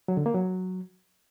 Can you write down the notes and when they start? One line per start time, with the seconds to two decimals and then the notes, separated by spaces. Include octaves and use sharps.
0.08 F#3
0.17 D3
0.26 A#3
0.35 F#3